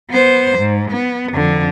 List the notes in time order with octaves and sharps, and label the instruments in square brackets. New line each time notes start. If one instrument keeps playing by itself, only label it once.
[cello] B3 C5
G#2
B3
F2 D3